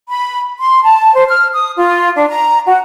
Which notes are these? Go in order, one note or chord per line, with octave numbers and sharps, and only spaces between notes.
B5
C6
A5
C5
F6
D#6
F4
D4
A#5
F#4